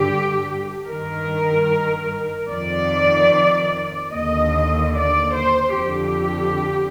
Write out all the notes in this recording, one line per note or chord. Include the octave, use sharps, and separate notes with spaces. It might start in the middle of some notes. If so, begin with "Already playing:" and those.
Already playing: G2 D3 G4
G2 D#3 A#4
F2 D#3 D5
D#2 D3 D#5
D5
C5
F2 D3 G4